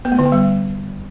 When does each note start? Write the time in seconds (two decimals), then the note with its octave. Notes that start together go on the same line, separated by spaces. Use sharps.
0.05 B3
0.12 A3
0.19 D3
0.25 B3
0.32 G3